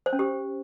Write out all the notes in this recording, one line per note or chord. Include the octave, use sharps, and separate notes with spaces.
C5
C#4
G4